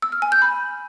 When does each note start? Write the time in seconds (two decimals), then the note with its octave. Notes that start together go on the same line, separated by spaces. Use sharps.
0.02 E6
0.12 F6
0.22 G#5
0.32 G6
0.42 B5